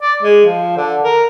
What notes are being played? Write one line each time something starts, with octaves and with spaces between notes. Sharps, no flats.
D5
G#3
F3
D3
A#4